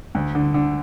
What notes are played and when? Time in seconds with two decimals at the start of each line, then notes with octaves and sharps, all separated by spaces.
0.15 D2
0.35 D3
0.54 D3